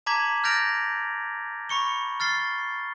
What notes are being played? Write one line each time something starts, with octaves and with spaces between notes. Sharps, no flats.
A5 A#5 D6 G#6 B6 F#7
F6 G6 A6 A#6 D7 F7
B5 C#6 C#7 G7
F6 A6 C7 G7